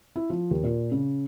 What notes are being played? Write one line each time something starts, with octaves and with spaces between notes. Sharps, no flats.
E4
F3
D#2
A#2
C#3